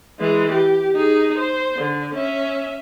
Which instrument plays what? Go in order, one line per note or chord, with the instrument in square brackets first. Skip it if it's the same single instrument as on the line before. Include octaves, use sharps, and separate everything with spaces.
[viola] E3 G#3
G4
D#4 G#4
C5
D3
C#4 E5